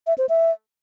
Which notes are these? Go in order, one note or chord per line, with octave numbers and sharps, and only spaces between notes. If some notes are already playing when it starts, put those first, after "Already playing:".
E5
C5
E5